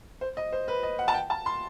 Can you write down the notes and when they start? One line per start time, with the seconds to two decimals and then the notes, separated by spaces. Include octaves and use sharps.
0.21 C5
0.37 D#5
0.52 C5
0.68 B4
0.83 D#5
0.99 F#5
1.08 A5
1.14 G5
1.30 A5
1.46 C6